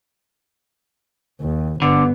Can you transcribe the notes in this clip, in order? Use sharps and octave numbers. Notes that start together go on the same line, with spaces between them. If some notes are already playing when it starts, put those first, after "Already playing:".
D#2
G1 D3 B3